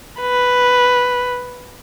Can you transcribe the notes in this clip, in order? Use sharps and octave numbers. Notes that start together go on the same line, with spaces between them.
B4